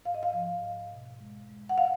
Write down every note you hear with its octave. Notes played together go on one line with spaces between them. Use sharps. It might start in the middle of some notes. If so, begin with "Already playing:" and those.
G#2 F5
D#5
F5
F3
G#2
B2
G#3
G#3
F#5
F5